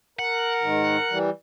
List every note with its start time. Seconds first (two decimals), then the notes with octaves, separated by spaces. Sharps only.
0.19 A#4 F#5
0.62 G#2 D#3
1.11 E3 G3